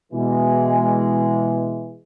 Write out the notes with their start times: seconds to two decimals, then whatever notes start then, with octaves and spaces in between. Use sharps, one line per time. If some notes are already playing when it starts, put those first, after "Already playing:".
0.12 B2 E3 G#3